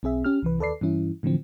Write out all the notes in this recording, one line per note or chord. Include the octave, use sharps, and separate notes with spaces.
B1 C4 G#4 E5
C#4 G4 F6
C2 E3 B4
D#2 A4 B4 D5 C7
G2 E3 C#4 E4
A2 D3 E3 F3 C4